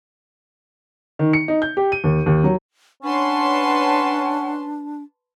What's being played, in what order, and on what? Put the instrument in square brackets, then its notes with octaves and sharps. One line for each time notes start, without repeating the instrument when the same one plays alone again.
[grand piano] D#3
C#7
D#4
G6
G4
D#7
D#2
D#2
F#3
[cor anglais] C#4 [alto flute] D4 [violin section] B4 A5 C6 [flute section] C#5 F#5